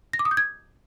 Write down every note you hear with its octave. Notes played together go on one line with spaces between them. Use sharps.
A#6
D6
D#6
G6
G#6